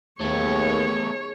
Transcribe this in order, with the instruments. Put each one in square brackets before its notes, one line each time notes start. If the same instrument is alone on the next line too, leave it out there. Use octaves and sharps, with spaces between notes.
[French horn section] D#2 [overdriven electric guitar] A3 B3 [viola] G#4 C#5